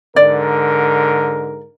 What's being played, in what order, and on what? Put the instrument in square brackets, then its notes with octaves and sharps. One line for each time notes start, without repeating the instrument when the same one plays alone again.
[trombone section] G#2 D3 A#4 [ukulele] D5